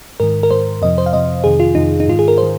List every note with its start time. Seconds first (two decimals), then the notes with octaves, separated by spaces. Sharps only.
0.20 G#2 D#3 A#4
0.43 A#4
0.51 G#2 D#3 C5
0.82 F2 C3 F3 D#5
0.98 C5
1.06 F5
1.13 F2 C3 F3 D#5
1.44 F2 C3 D#3 G#4
1.60 F4
1.75 F2 C3 D#3 D#4
2.00 D#4
2.07 G#2 D#3 F4
2.19 G#4
2.28 A#4
2.38 D#3 C5